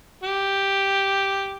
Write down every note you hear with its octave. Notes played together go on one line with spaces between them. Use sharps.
G4